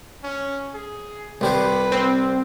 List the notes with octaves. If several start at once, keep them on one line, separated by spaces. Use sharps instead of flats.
C#4
G#4
C2 G3 B4 C5
C4